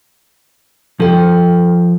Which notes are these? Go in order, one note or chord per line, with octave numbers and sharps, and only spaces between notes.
F3 A4 G5